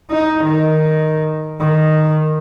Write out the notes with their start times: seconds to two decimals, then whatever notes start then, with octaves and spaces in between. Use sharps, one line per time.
0.10 D#4
0.43 D#3
1.60 D#3